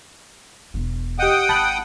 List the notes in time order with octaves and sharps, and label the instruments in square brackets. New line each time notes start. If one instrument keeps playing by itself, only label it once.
[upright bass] E1 D4
[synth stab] G4 D#5 [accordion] F#5 G5 D#6
[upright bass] G#1 [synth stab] A5 B5 F#6